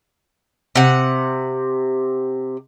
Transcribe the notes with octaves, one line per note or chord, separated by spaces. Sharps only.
C3 F#5